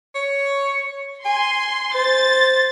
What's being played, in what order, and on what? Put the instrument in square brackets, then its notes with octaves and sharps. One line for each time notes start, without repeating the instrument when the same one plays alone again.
[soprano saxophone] C#5
[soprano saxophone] G#5 [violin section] C6
[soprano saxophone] C5 [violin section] A6